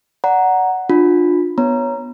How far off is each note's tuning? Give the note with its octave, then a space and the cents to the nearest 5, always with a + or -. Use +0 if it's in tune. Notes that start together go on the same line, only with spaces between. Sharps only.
D5 -15 F#5 +0 A#5 +0
D4 +30 F4 +30
B3 +0 C#5 +0 A#5 +0